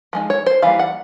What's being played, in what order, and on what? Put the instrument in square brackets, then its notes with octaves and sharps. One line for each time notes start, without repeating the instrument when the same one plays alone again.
[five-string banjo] F3 G#3 D#4
C#5
C5
E3 G3 A#3 F5
F#5